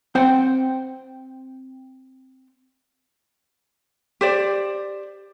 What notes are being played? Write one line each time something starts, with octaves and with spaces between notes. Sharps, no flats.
C4 C5 F#5 G5
G4 C5 D5